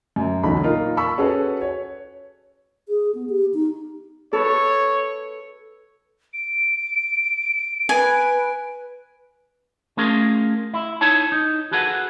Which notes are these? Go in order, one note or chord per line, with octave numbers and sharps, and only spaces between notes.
F#2
B1 E2 D3 C#4 A#5 B5
A#2 D#4 F4 A#4
B5 C#6 E6 B6
C#4 F#4 G#4 A4 B4
C#5
G#4
B3
G4
D#4
A4 B4 C#5
D7
B4 G#5
A3 C#4 F4 G#4 A#4
E4
D#4 E4 C#5 A5
D#4
F#4 G#4 A4 B4 D#5 F#5